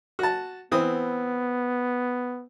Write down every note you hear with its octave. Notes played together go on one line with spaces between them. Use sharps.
F#4 A5
E3 B3 C4 D#6